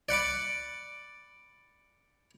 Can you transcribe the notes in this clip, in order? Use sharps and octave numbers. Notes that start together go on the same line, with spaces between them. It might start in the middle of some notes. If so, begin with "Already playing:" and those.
D5 F#5 B5 D6